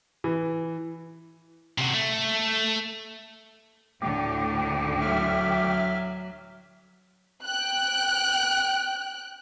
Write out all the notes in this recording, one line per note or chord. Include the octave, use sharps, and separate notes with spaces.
E3
C3 F#4
A3
D2 A2 D3 F#3 G5 D6
F#3 E5 F6
G5 F#6